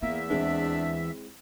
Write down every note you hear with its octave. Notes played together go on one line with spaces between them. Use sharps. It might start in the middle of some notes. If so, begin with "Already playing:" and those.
E2 A#3 B3 E4 E5
D#2 E3 G#3 C4 D4 E4